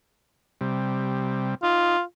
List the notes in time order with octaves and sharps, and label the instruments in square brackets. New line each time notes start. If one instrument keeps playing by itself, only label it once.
[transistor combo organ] C3 G3
[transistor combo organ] D#4 [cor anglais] F4